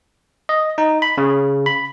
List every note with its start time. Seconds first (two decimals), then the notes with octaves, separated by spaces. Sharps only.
0.49 D#5
0.78 D#4
1.02 B5
1.18 C#3
1.66 B5